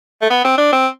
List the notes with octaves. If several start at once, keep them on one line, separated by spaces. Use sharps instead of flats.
A3
B3
C4
D4
C4